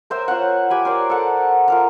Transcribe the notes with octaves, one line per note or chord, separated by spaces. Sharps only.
A#4 C5 E5 G5
F4 C#5 F#5
G4 G#5 B5
A#4 C5 D5
A4 A#4 F#5
F4 A#4 A#5